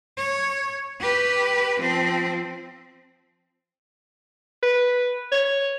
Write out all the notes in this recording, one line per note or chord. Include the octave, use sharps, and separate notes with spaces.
C#5
G4 B4
F3 C4
B4
C#5